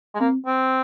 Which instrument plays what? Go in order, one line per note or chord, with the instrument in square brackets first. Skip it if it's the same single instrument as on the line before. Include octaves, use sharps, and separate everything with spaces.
[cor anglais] G#3
[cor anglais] A#3 [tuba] C4
[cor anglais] C4